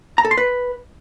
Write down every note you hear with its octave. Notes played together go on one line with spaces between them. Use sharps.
A#5
A4
C6
B4